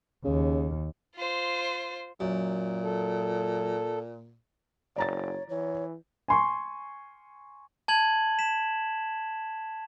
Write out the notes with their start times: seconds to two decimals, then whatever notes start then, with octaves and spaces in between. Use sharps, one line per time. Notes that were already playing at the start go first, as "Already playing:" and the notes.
0.25 D#2 C#3
1.16 F4 C5
2.20 F#2 A#2
2.84 A4
4.96 F#1 C#5 D5 A#5 A6
5.49 E3 C#5
6.28 G#5 C6 C#6
7.88 A5 G#6 F#7
8.39 B6 E7